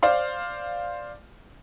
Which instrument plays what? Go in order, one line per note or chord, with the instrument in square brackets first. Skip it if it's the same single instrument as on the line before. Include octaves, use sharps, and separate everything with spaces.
[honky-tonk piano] C5 D5 F5 C6